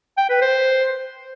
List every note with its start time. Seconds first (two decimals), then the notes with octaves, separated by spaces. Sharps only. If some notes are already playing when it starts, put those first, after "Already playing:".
0.18 G5
0.30 B4
0.42 C5